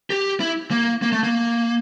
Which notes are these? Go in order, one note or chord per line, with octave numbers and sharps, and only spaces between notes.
G4
E4
A#3
A#3
A3
A#3